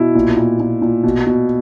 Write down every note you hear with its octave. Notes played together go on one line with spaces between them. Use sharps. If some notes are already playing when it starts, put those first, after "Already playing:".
Already playing: B2 E4
A#2
A#2
A#2
A#2
B2
B2